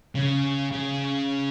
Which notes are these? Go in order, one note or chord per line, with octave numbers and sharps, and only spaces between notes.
C#3
C#3